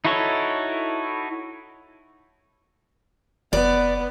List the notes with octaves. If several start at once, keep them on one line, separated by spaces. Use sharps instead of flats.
D#4 E4 F#4 A4 C#5
F#1 B3 D5